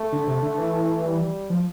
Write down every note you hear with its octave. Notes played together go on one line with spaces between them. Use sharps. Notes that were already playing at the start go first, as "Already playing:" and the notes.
Already playing: A3
D3
C3
D3
E3
G3
F3